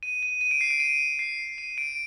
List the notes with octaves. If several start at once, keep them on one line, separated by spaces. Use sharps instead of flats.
D#7
D#7
D#7
D7
C7
D7
D#7
C7
D#7
D7